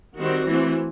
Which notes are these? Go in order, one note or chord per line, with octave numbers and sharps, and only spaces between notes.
D#3 G3 C4 F#4
E3 A3 C4